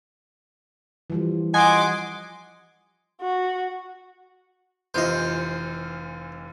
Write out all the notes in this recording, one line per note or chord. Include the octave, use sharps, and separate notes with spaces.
E3 F3 G3
D#5 F#5 G#5 C6 D6
F#4
F1 E3 F4 C5 D#5